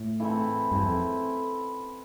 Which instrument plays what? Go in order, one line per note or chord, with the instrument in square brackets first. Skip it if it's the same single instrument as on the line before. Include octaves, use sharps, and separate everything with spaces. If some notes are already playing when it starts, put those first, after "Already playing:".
Already playing: [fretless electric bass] A2
[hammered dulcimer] E3 A3 C4 E4
[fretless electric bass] G2 [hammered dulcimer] E3 A3 C4 E4
[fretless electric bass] F2